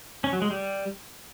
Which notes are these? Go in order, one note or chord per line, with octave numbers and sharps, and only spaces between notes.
C#4
F#3
G#3
G3